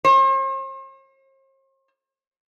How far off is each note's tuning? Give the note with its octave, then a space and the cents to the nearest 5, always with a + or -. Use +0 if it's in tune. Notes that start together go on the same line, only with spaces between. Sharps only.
C5 +45